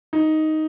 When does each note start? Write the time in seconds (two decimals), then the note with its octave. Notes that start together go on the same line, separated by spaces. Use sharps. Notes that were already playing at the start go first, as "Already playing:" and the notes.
0.13 D#4